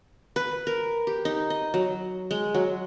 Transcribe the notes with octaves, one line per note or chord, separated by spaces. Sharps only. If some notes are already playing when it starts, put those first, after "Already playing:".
B4
A#4
G4
D#4
D#5
F#3
G#3
F#3